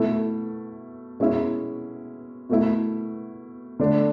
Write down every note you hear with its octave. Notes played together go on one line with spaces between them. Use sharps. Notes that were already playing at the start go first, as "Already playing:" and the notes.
Already playing: B2 A3 E4 A4
B2 G#3 C#4 E4
B2 A3 E4
D3 A3 D4